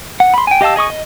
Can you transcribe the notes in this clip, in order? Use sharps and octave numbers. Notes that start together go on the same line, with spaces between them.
F#5
B5 C6
G5 G#5
G4 D#5 F5 A5 E6
G#4 D#5 C#6 D#6
D#5